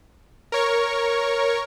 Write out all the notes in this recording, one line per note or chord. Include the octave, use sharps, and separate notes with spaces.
A#4 C#5 C#6